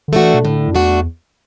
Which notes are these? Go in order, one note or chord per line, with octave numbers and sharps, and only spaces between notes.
D3
E3 A3 D4 F#4
B2
A2 D3
F#2
E2 A3 D4 F#4